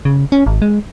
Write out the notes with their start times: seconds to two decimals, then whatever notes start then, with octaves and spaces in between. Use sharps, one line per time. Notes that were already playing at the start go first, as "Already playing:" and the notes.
0.05 C#3
0.32 C#4
0.46 G#1
0.62 G#3